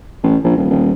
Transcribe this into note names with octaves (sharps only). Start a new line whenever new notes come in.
A1
A#1
D#1
D#1